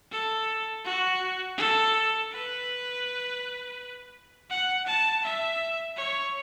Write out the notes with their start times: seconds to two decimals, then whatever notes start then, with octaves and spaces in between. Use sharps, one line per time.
0.11 A4
0.85 F#4
1.58 A4
2.32 B4
4.50 F#5
4.87 A5
5.24 E5
5.96 C#5